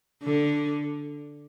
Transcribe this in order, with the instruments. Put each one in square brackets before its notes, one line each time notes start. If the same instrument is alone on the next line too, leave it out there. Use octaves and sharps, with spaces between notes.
[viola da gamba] D3